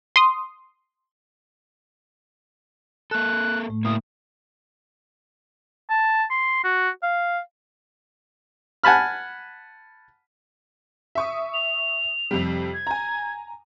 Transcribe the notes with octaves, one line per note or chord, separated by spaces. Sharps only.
C6 D#6
A#3 A4 F#6
A2 A3
A#3 E4 D#6
A5
C6
F#4
F5
F#5 G#5 A5 B5 F6
E5 C#6 D#6
F7
F2 C3 G3
G#6
G#5 A#5